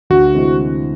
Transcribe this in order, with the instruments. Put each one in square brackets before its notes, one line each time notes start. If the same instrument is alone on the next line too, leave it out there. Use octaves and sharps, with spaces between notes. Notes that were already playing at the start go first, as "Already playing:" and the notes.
[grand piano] D2 [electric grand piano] F#4
[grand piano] C3 E3 G#3 C4